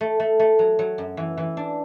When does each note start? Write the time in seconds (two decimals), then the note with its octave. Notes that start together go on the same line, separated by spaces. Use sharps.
0.01 A3
0.20 A3
0.39 A3
0.59 F#3
0.79 F#3
0.98 F#2
1.17 E3
1.37 E3
1.57 D4